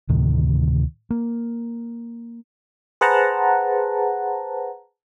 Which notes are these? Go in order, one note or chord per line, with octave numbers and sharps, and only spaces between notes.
D2 A2 C3 D#3
A#3
G#4 B4 C5 F#5 A5 A#5